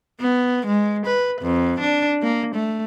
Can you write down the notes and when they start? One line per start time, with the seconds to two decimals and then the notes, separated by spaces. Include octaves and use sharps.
0.20 B3
0.66 G#3
1.06 B4
1.41 F2
1.80 D4
2.22 A#3
2.55 A3